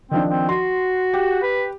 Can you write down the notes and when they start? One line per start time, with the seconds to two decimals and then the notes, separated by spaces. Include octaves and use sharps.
0.11 D#3 F3 C4 D4
0.28 C4
0.49 F#4 C6
1.14 G4
1.42 B4